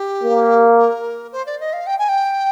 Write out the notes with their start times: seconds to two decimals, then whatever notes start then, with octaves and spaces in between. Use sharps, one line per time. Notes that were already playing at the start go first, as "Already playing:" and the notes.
Already playing: G4
0.23 A#3
0.78 A#4
1.32 C5
1.46 D5
1.60 D#5
1.73 F5
1.87 G5
1.99 G#5
2.09 G5